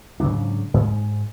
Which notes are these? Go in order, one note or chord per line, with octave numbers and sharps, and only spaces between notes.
G#2 C#3 F#3 D4
G#2 G#3